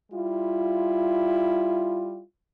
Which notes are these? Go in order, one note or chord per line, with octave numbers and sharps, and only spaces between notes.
G3 E4 F4